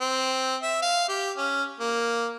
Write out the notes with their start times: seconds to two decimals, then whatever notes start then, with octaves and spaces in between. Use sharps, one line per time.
0.01 C4
0.62 E5
0.82 F5
1.09 G4
1.37 C#4
1.80 A#3